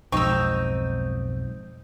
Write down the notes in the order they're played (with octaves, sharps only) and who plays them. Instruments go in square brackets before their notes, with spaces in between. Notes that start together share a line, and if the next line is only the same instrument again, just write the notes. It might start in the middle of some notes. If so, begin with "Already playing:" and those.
[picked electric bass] B1 F2 G#2 [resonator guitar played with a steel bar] C4 D#4 [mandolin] C#6 E6